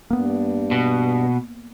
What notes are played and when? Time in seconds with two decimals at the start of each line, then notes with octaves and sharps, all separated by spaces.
0.10 G2 A#3 B3
0.71 B2